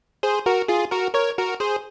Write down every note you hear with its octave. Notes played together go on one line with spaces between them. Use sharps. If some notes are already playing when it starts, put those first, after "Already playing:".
G#4 C5
F#4 A#4
F4 G#4
F#4 A#4
A#4 C#5
F#4 A#4
G#4 C5